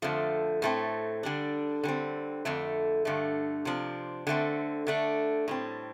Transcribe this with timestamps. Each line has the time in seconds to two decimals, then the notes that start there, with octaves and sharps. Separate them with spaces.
0.02 F2 D3 F3 A3
0.62 A2 A3 C4
1.23 D3 G3 D4
1.83 D3 G3 C4
2.45 F2 D3 A3
3.05 G2 D3 A3
3.65 C3 F3 D4
4.27 D3 A3 C4
4.87 D3 A3 D4
5.48 A2 G3 C4